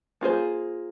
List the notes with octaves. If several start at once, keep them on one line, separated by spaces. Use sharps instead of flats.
A#3 F4 G#4 C5